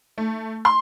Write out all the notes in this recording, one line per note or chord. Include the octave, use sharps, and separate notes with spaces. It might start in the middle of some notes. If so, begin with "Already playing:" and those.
A3
C6